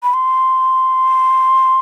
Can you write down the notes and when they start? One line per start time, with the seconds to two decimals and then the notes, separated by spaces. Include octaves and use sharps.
0.03 B5
0.14 C6